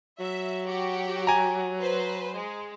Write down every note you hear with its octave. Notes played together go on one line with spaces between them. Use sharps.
F#3 E5
F#4 G4
G#5 A#5
B4 C5
G#3